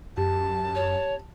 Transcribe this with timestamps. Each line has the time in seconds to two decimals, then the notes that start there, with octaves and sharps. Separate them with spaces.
0.17 F#2 G4 A5
0.75 C#5